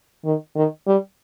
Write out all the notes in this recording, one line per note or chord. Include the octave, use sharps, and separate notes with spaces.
D#3
D#3
G3